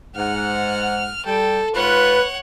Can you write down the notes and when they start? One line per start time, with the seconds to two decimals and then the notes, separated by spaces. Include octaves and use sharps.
0.16 G#2 F#5 F6
1.25 G3 A4 G5
1.75 G#2 F4 B4 C#5 F#5